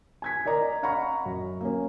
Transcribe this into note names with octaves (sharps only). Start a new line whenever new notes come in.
G#5 G#6 B6
A#4 D5 D#5 A#5
D#5 F5 F#5 A#5 B5 C#6
F#2
A#3 C#4